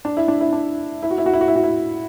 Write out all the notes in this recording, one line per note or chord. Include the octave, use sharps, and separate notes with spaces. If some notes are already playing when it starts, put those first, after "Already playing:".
D4
E4
D4
E4
D4
E4
F#4
E4
F#4
E4
F#4
E4
F#4
E4